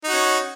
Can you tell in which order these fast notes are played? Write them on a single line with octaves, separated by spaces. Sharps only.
D#4 F#4 C#4